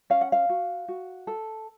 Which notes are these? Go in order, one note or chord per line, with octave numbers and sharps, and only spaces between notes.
C#4 F5
F#5
F5
F#4
F#4
A4